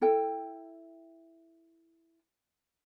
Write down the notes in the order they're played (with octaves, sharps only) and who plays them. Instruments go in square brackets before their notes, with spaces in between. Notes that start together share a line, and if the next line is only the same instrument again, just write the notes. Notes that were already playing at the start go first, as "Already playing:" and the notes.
[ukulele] E4 A4 G5